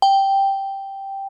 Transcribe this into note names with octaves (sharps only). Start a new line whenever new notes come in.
G5